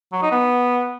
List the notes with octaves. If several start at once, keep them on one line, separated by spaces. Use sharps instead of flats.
F#3
D#4
B3